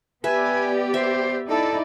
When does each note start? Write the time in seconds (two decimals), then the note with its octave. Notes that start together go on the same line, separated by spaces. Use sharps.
0.24 B3 G4 B4 D5 E5 G#5
0.94 C5 E5
1.49 D#4 E4 A4 D5